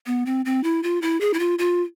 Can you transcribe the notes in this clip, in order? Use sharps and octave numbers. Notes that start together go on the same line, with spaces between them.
B3
C4
C4
E4
F4
E4
G#4
E4
F4
F4